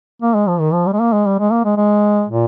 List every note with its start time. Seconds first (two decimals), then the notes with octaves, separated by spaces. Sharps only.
0.22 A#3
0.34 G#3
0.48 F3
0.60 D#3
0.73 F3
0.86 G3
0.93 G#3
1.00 A#3
1.13 G#3
1.26 G3
1.39 G#3
1.51 A#3
1.65 G#3
1.77 G#3
2.29 A#2